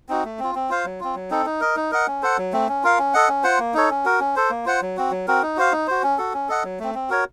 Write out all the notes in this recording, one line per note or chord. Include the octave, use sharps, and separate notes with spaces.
C4 D#4 F#4
A3
C4 F4
C4
F4 C5 F5
F#3
C4 F4
F#3
C4 D#4 A4
D#4
A#4 D#5
D#4
A#4 D#5 F#5
C#4
A4 C5 F#5
F#3
A3 C4
C#4
F4 A#4 F5
C#4
A4 D#5 F#5
C#4
F4 C5 F#5
A#3
D#4 A4 C#5
C#4
F#4 A#4
C#4
A4 C5
A#3
F4 C5 F#5
F#3
C4 F#4
F#3
C4 F#4 A#4
D#4
F#4 C5 F5
D#4
F#4 C5
C#4
F#4 A4
C#4
A4 D#5 F#5
F#3
A3 C4
C4
F#4 A#4 C#5